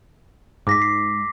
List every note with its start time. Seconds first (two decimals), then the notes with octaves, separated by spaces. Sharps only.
0.67 G#2 D6 A#6 B6
0.82 C7